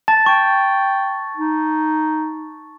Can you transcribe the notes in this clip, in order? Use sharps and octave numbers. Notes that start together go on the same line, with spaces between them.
A5 A6
G5 C#6
D#4